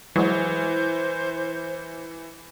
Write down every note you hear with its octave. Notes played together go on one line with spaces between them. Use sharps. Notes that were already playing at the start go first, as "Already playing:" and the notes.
E3 F#3 G#3 C5